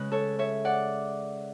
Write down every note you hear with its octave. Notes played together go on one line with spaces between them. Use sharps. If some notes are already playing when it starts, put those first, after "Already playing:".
Already playing: C#3 G#3 B4
A4 C#5
C#5 E5
D5 F#5